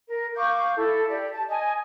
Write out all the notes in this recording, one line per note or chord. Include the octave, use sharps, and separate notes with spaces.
A#4
F5 C#6 D6 G6
E4 A4
G4 D5
A5
D#5 G#5